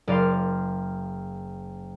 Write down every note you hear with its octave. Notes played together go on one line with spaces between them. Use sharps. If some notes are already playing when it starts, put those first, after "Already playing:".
F#1 D5 F5 C6